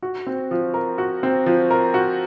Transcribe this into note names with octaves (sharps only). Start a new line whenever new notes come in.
F#4
C4
F3
A#4
F#4
C4
F3
A#4
F#4